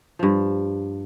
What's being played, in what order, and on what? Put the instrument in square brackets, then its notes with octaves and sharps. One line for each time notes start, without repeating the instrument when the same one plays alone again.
[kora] G2 F3